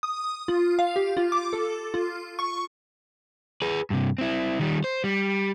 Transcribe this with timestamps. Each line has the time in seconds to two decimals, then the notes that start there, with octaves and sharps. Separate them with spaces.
0.03 D#6
0.48 F4
0.79 F5
0.96 G4
1.17 F4
1.32 D6
1.53 A4
1.94 F4
2.39 C#6
3.62 G#4 B4
3.90 G2 C3
4.18 C4 E4
4.60 D#3 G3
4.84 C5
5.04 G3